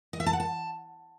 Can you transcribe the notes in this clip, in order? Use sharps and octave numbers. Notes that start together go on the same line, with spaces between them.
D#5
E5
A5
F#5
A5